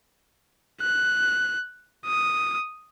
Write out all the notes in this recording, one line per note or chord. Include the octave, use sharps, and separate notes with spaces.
F#6
D#6